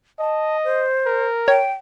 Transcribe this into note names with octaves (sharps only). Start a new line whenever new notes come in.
D#5 A5
C5
A#4
C#5 G5